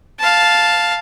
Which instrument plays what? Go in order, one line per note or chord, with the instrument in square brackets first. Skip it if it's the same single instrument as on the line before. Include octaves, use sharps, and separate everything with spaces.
[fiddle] F5 A5